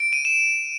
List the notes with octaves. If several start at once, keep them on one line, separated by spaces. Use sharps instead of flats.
D7
D#7
E7